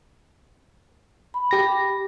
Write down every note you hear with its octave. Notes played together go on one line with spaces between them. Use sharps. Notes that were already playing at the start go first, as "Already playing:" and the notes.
B5
G4 A#6